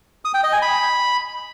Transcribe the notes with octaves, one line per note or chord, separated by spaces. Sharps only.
D#6
G5
D#5
G#5
B5